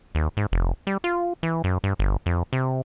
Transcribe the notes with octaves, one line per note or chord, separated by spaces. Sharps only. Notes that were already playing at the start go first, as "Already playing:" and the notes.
D#2
G#2
F1
G3
F4
E3
F#2
G2
G1
F2
C3